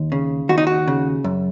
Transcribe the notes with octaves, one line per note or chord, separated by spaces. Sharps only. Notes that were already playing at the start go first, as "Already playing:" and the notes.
Already playing: D#2
C#3
D#2 F#4
D#4
F#4
C#3
F#2